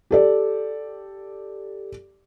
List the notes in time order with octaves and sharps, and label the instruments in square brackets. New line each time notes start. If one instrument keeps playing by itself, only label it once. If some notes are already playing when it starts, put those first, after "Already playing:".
[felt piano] G4 A4 D5